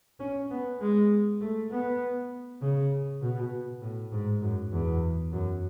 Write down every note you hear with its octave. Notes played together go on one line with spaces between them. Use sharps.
C#4
B3
G#3
A3
B3
C#3
B2
A2
G#2
F#2
E2
F#2